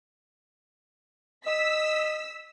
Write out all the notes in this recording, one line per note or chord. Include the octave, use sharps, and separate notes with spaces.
D#5 E6 B6